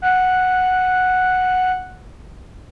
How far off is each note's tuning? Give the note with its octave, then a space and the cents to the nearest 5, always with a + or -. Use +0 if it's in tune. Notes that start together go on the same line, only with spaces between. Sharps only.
F#5 -5